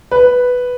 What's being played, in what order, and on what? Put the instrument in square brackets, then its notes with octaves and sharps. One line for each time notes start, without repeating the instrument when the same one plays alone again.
[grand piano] B4